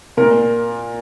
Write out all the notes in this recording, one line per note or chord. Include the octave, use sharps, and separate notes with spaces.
A#2 A#4